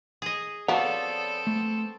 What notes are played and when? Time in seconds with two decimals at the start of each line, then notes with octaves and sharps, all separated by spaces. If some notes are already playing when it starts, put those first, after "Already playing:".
0.22 G#4 D#5
0.68 F3 B3 C4 F#4 A4 C#5 D5 A5
1.47 A3